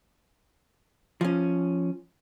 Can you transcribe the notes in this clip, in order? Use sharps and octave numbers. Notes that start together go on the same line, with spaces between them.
F3 C#4